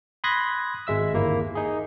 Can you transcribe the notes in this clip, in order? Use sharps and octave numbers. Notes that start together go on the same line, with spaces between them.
B5 C6 D#6 F#6 G#6 A#6
G#1 G#3 E5 E6
G1 D#2 A#3 E4
D#4 G#4